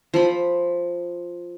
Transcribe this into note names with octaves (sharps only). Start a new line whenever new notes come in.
F3 B5